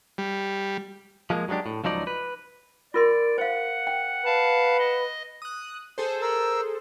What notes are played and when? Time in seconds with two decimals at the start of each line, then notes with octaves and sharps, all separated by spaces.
0.18 G3
1.30 F3 G#3 A#3
1.49 F#3 G#3 C4 D4 G4
1.66 A2
1.84 C#2 F3 F#3 D#4 D5
2.07 B4
2.94 F4 A#4 D5 C6
3.38 C5 F5 F#5
3.87 G5
4.25 B4 F5 A5
4.79 D#5
5.42 D#6 F#6
5.98 G#4 A4 C5
6.22 A#4 E6